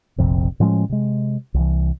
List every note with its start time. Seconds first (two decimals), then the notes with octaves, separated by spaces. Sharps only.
0.18 F1 A#1 F2 C3
0.60 A2 F3 G#3 C#4
0.89 C3 G#3
1.54 C2 E3